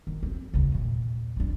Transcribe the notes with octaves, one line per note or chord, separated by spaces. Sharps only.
D#3
C4
D2 C#3
E2 A#2
F3 D4